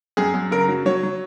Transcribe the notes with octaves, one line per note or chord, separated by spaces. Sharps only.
F#2 G#4
F#2
C#3 A#4
F#3
F#3 C#5
F#3